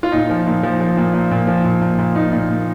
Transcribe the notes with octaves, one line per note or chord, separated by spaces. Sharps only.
F4
A#2 D#4
F3
A#2
F3
F3
A#2
A#2
A#2
F3
A#2
A#2
A#2
A#2 D#4
A#2
A#2